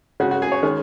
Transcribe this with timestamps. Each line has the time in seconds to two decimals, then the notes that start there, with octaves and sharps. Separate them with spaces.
0.20 C#3 G#3 C#4 F#4
0.31 F#4
0.42 G#4
0.52 C#5
0.63 D#3 G#3 C#4